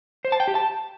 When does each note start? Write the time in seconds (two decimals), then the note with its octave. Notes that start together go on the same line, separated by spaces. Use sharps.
0.25 C5
0.32 A5
0.40 G5
0.48 G4
0.55 A5